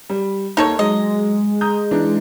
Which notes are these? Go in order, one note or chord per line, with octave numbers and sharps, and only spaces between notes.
G3
D#2 D#4 A4 C#5
F#3 G#3 D#5
A#5 D#6 G6
E3 D4 D#4